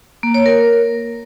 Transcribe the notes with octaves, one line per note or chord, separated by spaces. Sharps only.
A#3
C#5
A#4